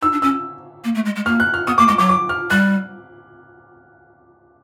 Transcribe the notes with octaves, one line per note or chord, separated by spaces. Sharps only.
D#4 E6
D4
C#4 E6
A#3
A3
G#3
G#3
A#3 F6
F#6
F6
B3 D#6
A#3 D6
G#3 D6
F#3 D6
D6
F6
G3 F#6